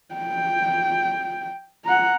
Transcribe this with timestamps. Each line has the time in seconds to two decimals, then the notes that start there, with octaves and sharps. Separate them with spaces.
0.15 G5
1.85 F#5 A#5